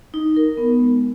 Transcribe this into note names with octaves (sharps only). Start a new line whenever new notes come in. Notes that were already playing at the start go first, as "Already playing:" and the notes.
D#4
A#4
B3
G#3